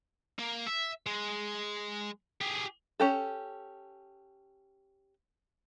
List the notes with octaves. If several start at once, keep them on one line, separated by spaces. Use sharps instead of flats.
A#3
E5
G#3
G4 G#4
C#4 G4 A4